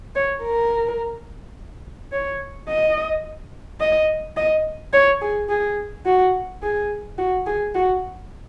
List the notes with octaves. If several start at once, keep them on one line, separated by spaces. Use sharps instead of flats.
C#5
A#4
C#5
D#5
D#5
D#5
C#5
G#4
G#4
F#4
G#4
F#4
G#4
F#4